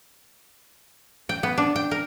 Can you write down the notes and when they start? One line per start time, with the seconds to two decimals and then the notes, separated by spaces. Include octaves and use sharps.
1.29 G5
1.43 B3
1.58 D4
1.76 G5
1.91 A#4